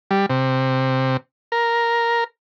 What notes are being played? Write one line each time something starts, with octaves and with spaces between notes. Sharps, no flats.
G3
C3
A#4